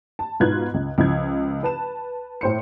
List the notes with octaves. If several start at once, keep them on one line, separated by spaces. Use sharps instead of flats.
A5
G#2 B2 F4 B4 F#6 G#6
C#2
C#2 F3 G#6
B4 A5 E7
A2 C5 C#7